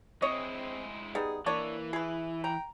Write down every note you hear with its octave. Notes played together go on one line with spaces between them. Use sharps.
G#3 C4 E4 C#5 D#5
G3 B3 D#4 G#4
E3 A#3 D4 C#5
E4 G#4 B4
G5 A#5